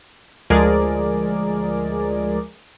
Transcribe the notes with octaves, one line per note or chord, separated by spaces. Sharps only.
D2 F3 G#3 G#4 A#4 D5